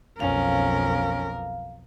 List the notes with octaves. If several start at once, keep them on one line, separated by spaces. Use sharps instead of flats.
B1 F2 C#4 A#4 F5